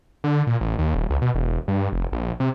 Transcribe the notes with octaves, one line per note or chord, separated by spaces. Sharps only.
D3
A#2
A1
D#2
D#1
C#2
B2
E1
G2
F1
A#1
C3